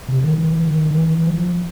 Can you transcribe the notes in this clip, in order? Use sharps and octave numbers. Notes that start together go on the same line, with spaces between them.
C3
D#3
E3
D#3
D#3
E3
F3